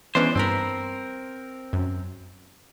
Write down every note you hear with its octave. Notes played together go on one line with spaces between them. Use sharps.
E3 G#3 B3 C#4 D4 C5
G2 C4 A#4 A5 B5
F#2